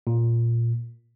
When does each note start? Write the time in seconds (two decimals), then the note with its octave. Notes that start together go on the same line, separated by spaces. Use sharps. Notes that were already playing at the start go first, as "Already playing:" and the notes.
0.07 A#2